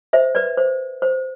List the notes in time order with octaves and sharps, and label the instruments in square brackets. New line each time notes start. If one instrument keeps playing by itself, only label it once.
[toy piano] C5 E5
B4 D5
C5
C5